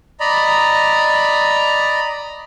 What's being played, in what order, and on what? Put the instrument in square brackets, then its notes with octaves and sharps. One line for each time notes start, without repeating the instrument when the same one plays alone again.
[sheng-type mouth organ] D5 D#5 A#5 B5